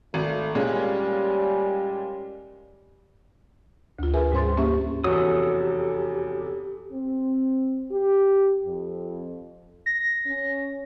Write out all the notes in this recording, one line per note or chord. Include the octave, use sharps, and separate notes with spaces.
G#1 A3
A#2 G3 G#3 C#4
D2 F4
G#4 A#4 B4 E5 G#5
G#2 G3 C#4 C5 C6 A6
A#3 C#4 G4 E5 C#6
F1 E2 F#4 G4 A4 C#5 D#6
C4
G4
F2
A#6
C#4